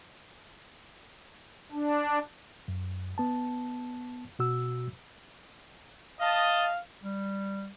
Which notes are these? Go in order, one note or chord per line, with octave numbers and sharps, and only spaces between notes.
D4
F#2
B3 A5
B2 F#4 E6
D#5 F5 A5
G3